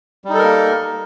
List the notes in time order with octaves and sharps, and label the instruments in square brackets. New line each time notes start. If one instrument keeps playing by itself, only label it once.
[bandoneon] G3
D#4
A4
A#4
A#3